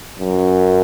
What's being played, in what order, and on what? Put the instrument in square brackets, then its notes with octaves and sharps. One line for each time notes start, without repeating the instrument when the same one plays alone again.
[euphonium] F#2